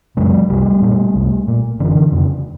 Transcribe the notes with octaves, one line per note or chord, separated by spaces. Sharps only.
F#2 C#3 F#3 G#3
C2 G3 A3
A#2
C2
A#2
F#1 D3 E3
F2 C#3 D#3